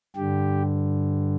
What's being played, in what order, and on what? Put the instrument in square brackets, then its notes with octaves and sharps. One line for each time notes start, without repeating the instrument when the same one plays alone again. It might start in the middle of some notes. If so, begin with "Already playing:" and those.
[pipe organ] G2 D3 G4